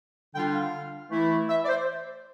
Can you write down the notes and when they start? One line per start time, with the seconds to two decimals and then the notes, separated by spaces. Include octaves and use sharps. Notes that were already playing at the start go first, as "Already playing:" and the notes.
0.34 D3 G3 D4 F4 G5
0.53 F5
1.10 E3 A3 E4
1.49 E5
1.64 D5
1.68 C5